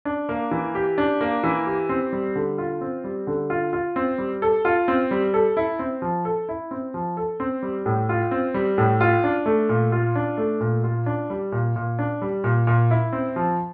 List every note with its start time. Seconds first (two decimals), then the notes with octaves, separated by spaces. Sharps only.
0.05 D4
0.29 A#3
0.51 E3
0.75 G4
0.98 D4
1.21 A#3
1.44 E3
1.66 G4
1.89 C4
2.13 G3
2.36 D3
2.58 F4
2.81 C4
3.04 G3
3.27 D3
3.50 F4
3.73 F4
3.96 C4
4.18 G3
4.42 A4
4.65 F4
4.88 C4
5.11 G3
5.34 A4
5.57 E4
5.79 C4
6.02 F3
6.25 A4
6.49 E4
6.71 C4
6.94 F3
7.17 A4
7.40 C4
7.63 G3
7.86 A2
8.09 F4
8.31 C4
8.54 G3
8.78 A2
9.01 F4
9.24 D4
9.46 A3
9.69 A#2
9.92 F4
10.15 D4
10.38 A3
10.61 A#2
10.84 F4
11.06 D4
11.30 G3
11.52 A#2
11.76 A#2
11.99 D4
12.22 G3
12.44 A#2
12.67 A#2
12.91 E4
13.13 C4
13.36 F3